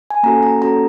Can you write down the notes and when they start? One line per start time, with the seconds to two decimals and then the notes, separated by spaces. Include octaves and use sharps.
0.10 G#5
0.23 A#3 C#4 F#4 A4 A#5
0.43 A#5
0.62 A#3 C#4 F#4 A4 A#5